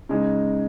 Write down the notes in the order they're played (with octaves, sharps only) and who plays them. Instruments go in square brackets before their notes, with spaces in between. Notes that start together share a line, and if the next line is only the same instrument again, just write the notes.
[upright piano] C#3 G#3 D#4